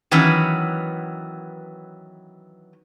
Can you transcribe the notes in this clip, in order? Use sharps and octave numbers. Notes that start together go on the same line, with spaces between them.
D#3 E3 F#3 B3 C#4